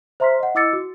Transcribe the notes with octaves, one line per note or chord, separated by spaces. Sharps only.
C5 E5 A#5 C6 F6 B6
D#5 F#5
E4 D#5 D6 E6 A6 C#7
F#4